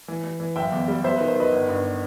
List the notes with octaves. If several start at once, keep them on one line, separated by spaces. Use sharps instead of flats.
E3
E3
E3
F#1 E5 G5
E2
G3
B3 C5 E5
D#3 B4
C5
D#3 B4 D#5
G1
G2